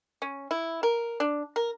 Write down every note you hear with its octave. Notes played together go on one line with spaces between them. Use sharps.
C#4
E4
A#4
D4
A#4